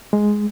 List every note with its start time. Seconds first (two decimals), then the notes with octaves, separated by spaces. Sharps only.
0.13 G#3